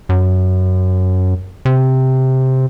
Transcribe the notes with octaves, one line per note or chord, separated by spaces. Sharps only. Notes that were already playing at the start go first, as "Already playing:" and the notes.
F#2
C3